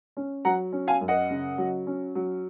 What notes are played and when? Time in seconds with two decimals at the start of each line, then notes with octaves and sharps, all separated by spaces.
0.17 C#4
0.45 F#3 F#5 A#5
0.73 C#4
0.88 F5 G#5
1.01 F#2
1.08 D#5 F#5
1.30 C#3
1.58 F#3
1.87 C#4
2.15 F#3